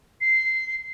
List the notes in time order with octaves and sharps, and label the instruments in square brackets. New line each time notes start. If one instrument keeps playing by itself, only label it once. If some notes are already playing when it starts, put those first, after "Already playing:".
[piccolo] C7